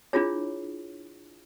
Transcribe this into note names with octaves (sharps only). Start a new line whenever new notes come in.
D4 E4 F4 G#4 C#5